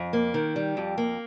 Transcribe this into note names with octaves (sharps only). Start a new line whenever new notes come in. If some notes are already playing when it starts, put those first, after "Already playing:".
Already playing: F2
A#3
D#3
G3
F2
A#3